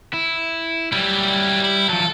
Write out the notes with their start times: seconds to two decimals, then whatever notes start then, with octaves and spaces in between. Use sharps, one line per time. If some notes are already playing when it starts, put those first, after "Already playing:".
0.13 E4
0.92 F#3 G3 E4
1.64 E4
1.89 F3 F#3 A4